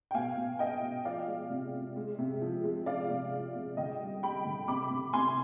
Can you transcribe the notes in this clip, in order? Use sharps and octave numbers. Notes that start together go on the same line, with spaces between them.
G5
B2 F5 G#5
B2
B2 D#5 G5
B2
F3 D5 F5
G#3
C3
C3
G#3
C3
F3
G#3
F3 D5 F5
C3
F3
C3
D3 D#5 G5
G3
G3 G5 B5
D3
C3 B5 D6
C3
C3 G#5 C6